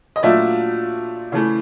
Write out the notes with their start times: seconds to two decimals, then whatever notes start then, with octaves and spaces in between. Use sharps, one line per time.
0.16 D#5
0.23 A#2 F#3 A3 D4 F4 D5 E5
1.32 C#3 E3 A3